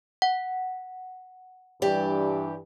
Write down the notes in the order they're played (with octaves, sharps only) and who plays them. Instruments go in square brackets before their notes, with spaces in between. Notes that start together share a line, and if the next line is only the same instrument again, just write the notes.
[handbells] F#5
[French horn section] G2 E3 [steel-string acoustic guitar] G4 D5